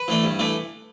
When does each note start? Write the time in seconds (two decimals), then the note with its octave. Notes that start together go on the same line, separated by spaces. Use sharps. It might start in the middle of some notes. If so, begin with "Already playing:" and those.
Already playing: B4
0.08 E3 A3 D4
0.24 G2
0.39 E3 A3 D4